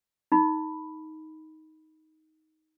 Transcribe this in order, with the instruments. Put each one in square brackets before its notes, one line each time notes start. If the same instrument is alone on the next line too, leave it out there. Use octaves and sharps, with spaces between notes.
[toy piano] D#4 B5